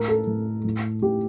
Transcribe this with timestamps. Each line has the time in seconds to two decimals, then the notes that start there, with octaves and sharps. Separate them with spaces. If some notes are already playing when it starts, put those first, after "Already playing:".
Already playing: A2 A#4
0.08 A4
0.27 A2
0.64 A2
1.02 A2 G4